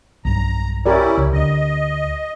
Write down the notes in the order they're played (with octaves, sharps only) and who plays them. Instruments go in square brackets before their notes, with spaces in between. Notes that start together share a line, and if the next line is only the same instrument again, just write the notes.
[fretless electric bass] B1 G2 [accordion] A#5
[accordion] C#4 E4 [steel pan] G4 A#4 D5
[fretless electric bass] C#2
[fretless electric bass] D2 D3 [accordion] D#5